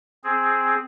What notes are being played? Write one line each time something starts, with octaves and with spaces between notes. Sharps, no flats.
C4 G#4